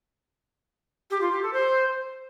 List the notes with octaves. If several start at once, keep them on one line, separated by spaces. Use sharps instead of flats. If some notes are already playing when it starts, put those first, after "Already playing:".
G4
F4
G4
A4
C5